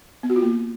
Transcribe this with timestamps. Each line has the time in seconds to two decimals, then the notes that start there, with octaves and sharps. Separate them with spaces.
0.23 B3
0.30 F#4
0.36 F4
0.42 A#3